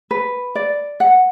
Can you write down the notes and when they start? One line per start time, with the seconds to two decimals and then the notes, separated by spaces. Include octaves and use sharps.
0.11 B4
0.55 D5
1.00 F#5